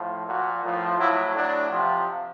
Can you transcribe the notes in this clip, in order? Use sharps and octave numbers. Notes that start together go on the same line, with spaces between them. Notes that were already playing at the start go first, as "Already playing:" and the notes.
Already playing: A2 F3
A#2 F3 F#4
A2 F3
A2 F#3 E4
A2 F#3 D4
C3 F3